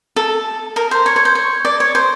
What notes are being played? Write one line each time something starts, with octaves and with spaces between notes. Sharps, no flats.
A4
A#4
C5
C#5
C#5
C5
C#5
D5
C#5
C5